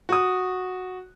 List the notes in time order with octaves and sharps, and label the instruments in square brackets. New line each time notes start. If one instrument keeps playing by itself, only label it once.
[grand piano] F#4 D#6